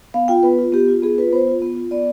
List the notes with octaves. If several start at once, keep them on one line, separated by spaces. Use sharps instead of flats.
B3 F5
F4 G5
B3 B4
F4
B3 G4
F4
B3 G#4
F4 B4
B3 C5
F4
B3
F4
B3 D5